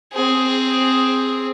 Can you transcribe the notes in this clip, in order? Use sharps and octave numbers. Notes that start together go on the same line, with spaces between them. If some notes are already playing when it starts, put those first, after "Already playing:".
C4 G#4